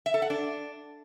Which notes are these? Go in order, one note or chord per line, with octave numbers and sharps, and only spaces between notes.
E5
A4
F#5
D4